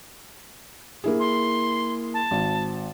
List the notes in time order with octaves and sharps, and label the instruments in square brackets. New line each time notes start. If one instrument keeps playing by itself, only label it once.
[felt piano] A#3 E4 G#4
[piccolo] C6
A5
[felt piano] G#1